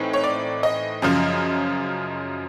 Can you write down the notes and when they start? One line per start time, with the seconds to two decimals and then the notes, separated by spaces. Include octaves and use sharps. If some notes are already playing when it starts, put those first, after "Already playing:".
Already playing: A2 E3 C4 D#4
0.13 C#5
0.24 D5
0.63 D#5
1.02 F#2 C#3 F3